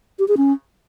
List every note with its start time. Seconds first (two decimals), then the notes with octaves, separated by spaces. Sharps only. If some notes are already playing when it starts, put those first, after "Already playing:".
0.19 G4
0.28 G#4
0.37 C#4